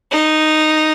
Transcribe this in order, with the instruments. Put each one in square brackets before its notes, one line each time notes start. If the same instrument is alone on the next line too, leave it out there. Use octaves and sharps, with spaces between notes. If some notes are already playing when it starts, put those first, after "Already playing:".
[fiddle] D#4